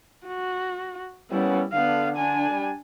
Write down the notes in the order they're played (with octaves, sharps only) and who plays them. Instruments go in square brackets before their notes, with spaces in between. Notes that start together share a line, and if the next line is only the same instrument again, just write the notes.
[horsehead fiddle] F#4
[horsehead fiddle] G3 E4 [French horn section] A#3 B3 C#4
[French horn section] D3 [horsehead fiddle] B3 F5
[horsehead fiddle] D4 G#5
[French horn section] G3